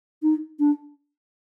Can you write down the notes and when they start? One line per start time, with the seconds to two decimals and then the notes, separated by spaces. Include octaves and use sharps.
0.23 D#4
0.60 D4